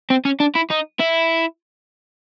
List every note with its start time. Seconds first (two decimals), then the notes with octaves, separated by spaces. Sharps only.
0.10 C4
0.25 C#4
0.40 D4
0.55 E4
0.70 D#4
1.00 E4